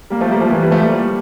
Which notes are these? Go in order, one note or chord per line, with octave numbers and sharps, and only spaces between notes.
G3 A#3
F3 A3
G3 A#3
F3 A3
E3 G3
E3 G3
F3 A3
G3 A#3